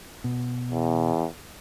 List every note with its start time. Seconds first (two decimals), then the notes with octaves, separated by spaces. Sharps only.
0.24 B2
0.71 E2